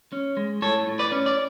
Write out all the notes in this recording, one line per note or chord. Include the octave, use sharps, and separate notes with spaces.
C#4
G#3
A2 A4 C#5
A2
B4 D5
C#4
D5